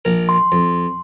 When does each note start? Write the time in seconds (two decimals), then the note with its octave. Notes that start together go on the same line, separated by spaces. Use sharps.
0.05 A#1 A#4
0.29 C6
0.52 F2